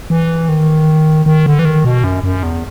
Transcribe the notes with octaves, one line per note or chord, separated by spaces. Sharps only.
E3
D#3
D#3
D3
E3
D#3
B2
F#2
F#2
E2